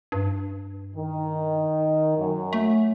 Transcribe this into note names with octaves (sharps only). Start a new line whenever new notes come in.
G2
D#3
F#2
A3